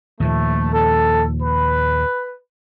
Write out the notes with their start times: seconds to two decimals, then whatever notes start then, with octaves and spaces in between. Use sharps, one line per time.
0.20 D#2 A#2 F3 A3
0.71 A4
1.42 B4